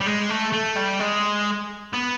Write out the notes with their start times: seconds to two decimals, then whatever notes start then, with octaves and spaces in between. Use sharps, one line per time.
0.01 G3
0.07 G#3
0.30 A3
0.53 A3
0.76 G3
1.00 G#3
1.93 B3